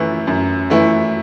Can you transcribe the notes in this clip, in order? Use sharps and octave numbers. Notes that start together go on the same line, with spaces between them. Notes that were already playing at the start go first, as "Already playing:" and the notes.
Already playing: F#2 E3 A3 E4
F#2
E3 A3 E4